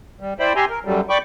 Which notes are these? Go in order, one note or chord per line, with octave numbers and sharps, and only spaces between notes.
G3
E4 C5 D5 E5 G5 B5
G4 E5 G#5 A#5 C6
A#4
F#2 F#3 G3 A3
D5 G5 B5 C#6 D6